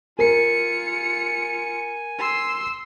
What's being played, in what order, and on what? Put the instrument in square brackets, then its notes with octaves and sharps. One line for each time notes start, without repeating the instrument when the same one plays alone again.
[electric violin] F4 C#7 [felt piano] A#4 [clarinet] G#5
[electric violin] C6 E6